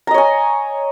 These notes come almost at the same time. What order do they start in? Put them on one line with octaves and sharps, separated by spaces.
A#5 D#5 C#5 G#5